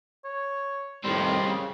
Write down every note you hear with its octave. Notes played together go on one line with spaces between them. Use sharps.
C#5
F2 A2 D#3 G3 C4 C6
C#3